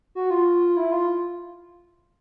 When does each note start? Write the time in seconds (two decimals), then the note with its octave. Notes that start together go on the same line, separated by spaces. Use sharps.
0.15 F#4
0.30 F4
0.77 E4
0.92 F4